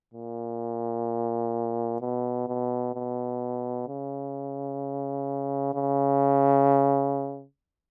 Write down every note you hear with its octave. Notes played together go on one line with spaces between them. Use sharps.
A#2
B2
B2
B2
C#3
C#3